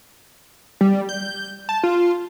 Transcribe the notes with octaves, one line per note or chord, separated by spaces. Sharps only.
G3
G6
A5
F4